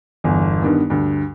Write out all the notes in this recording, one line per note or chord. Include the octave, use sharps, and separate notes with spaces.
G1 E2
G2 D#3 B3
D2 G2